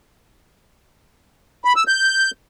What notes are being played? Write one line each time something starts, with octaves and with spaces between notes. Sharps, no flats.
B5
E6
G6